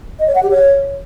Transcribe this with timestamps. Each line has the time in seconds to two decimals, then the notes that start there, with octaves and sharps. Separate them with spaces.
0.19 D#5
0.27 C#5
0.35 F#5
0.43 G4
0.51 C#5